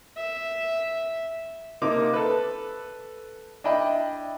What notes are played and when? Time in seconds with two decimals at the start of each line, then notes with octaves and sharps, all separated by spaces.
0.17 E5
1.82 C3 A#3 D#4 D6
2.13 A4 B4
3.64 D4 E4 D#5 G5 B5